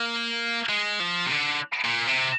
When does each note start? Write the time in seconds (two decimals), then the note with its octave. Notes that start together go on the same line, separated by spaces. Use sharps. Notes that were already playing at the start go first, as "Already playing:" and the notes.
Already playing: A#3
0.69 G#3
1.00 F3
1.26 C3
1.30 D3
1.84 A#2
2.07 C3